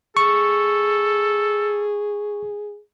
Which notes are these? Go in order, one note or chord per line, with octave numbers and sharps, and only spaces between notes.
G#4 A4 C#6